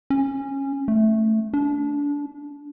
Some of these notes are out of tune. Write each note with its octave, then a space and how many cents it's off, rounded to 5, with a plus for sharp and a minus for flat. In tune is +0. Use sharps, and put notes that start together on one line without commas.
C#4 -15
A3 +0
D4 -25